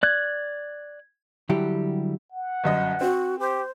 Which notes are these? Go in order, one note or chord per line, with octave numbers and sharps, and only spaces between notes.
D5 F#6 G#6
D3 F#3 G3 E4 G4
F#5
G1 F#2 D#5
C4 F#4
G4 C5